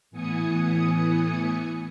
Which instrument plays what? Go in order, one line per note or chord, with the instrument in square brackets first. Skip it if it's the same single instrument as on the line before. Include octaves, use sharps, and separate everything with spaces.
[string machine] A2 E3 B3 G#5 D#6 C#7